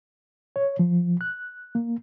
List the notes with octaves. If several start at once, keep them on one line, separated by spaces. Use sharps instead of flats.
C#5
F3
F#6
A#3